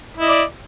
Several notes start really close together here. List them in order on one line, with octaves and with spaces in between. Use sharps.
E4 D#5 D5